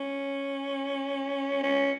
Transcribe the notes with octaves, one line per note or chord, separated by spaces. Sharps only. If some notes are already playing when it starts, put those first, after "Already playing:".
Already playing: C#4
C#4